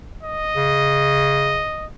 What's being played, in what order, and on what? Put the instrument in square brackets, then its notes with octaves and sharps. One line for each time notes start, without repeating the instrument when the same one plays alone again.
[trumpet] D#5
[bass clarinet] C#3